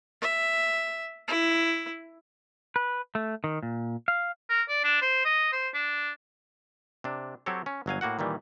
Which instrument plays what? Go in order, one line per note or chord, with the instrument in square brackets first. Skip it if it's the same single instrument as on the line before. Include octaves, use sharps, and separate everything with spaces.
[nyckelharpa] E5
E4
[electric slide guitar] B4
A3
D#3
A#2
F5
[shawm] A#4
D5
D4
C5
D#5
C5
D4
[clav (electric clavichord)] C3 D4
F#3 C4 G4 A4 C#5
C#4
G1 F#3 F5 G#5
A2 A#3 F#4 F#5
A#2 D#3 E3 G3